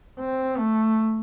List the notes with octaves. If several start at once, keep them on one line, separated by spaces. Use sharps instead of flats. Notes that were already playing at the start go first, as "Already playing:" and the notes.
C4
A3